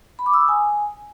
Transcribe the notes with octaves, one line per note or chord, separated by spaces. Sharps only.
B5
D6
E6
D#6
G#5